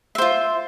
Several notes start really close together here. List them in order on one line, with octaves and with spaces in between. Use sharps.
E5 C5 F4